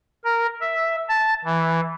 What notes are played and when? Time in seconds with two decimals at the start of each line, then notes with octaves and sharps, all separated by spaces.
0.24 A#4
0.61 E5
1.09 A5
1.45 E3